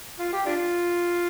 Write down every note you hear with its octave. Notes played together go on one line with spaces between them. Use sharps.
F4
G4
D4 F4